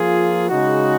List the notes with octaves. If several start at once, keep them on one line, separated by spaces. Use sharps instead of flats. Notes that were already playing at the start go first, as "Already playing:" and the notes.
Already playing: F3 A#3 F4 G#4
C#3 G#3 D#4 F#4